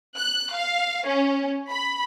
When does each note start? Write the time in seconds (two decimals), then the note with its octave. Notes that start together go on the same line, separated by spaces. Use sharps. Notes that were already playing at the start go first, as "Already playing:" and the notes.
0.17 F#6
0.53 F5
1.06 C#4
1.71 B5